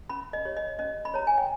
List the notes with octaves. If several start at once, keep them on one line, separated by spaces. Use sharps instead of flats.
C#4 B5
D#5
G4 C#5
D#5
C#4 D#5
B5
G4 C#5 A#5
G#5
G5